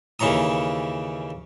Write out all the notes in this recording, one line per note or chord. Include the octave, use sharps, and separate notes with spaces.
D#2 C#3 E3 C#5 A#5 D#6